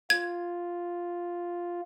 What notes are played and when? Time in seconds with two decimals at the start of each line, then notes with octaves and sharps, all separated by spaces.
0.10 F4 G#6